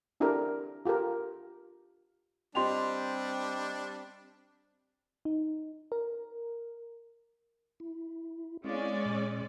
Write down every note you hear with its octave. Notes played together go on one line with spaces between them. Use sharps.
C4 D4 E4 G4 A4 A#4
F4 G4 A4 A#4
G3 C4 D4 G4 D#5 G5 C6 F7
D#4
A#4
E4
G#3 C4 C#4 E4 D5 F5
A#2